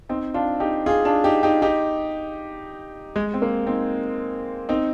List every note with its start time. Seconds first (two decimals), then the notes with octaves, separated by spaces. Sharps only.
0.09 C4 D#4
0.34 D4 F4
0.60 D#4 G4
0.86 F4 G#4
1.05 D4 F4
1.24 D#4 G4
1.43 D#4 G4
1.62 D#4 G4
3.16 G#3
3.34 C4
3.42 A#3
3.67 C4 D#4
4.69 C4 D#4